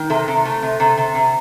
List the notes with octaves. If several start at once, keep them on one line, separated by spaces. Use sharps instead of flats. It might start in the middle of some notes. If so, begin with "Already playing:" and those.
Already playing: D#3
C3 A4
C3
A3
C3
C3
C3
C3